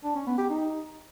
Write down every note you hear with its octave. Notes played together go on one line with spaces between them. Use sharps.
D4
C#4
B3
G4
D#4